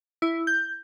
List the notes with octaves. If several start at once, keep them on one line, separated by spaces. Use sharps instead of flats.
E4
G6